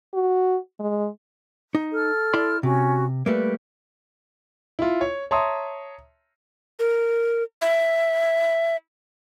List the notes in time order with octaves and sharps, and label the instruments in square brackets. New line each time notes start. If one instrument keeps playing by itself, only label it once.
[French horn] F#4
G#3
[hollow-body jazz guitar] D#4
[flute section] A4 F6
[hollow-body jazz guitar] E4 D5 C6
[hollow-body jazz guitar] C3 [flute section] C#4 F#4
[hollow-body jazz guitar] G3 A3 A#3 [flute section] B4
[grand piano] E4 F4
C#5
C#5 E5 A5 A#5 C6 D#6
[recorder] A#4
E5